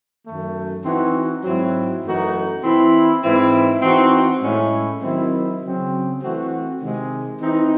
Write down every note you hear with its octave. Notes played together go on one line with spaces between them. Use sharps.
F#2 D#3 A3
E3 C4 D#4 F#4
G#2 F#3 C4 E4
F#2 E3 A3 D#4 F#4
E3 C4 E4
G#2 E3 C4 E4
E3 C4 D#4 F#4
A2 G#3 C#4 E4
D#3 F#3 C4 E4
C#3 F#3 C4
E3 A3 C4 F#4
C3 D#3 G#3
E3 C4 D#4